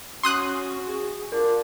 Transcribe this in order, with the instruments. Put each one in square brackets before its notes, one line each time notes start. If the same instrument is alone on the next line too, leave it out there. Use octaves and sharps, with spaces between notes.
[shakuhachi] C#4 [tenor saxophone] F#4 [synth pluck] C6 D#6 F#6
[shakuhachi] G#4
[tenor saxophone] D4 [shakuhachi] F4 [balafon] A#4